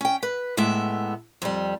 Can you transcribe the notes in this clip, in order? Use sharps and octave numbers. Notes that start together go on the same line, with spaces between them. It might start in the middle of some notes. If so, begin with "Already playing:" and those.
C#4 G5
B4
A2 G#3 B3 E5
F2 G3